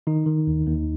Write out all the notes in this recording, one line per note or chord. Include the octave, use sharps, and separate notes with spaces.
D#3 D#4
D#3
D#2
D#2